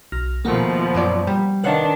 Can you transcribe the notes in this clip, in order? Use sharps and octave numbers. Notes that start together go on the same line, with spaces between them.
B1 F6 A#6
D#2 B2 F3 A3 A#3 F#5 A#5
F#2 F#3 D5
G3
C2 D#3 D4 B4 C#5 D#5 F5 F#5